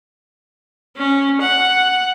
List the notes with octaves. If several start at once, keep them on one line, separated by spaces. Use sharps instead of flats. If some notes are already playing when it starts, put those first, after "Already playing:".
C#4
F#5